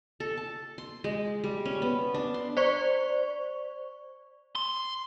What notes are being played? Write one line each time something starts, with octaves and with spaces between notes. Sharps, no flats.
A4
A5
C6
G#3
G3
C#4
B3
D4
C6
C5 D5 C#6
C6